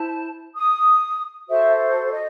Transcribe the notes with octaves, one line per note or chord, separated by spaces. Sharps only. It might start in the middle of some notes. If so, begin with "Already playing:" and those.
Already playing: E4 C5 A5
D#6
F#4 A4 C5 E5
D#5